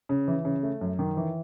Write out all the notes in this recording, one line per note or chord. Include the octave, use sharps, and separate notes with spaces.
C#3
E3
C#3
A3
F#2
D#3
E3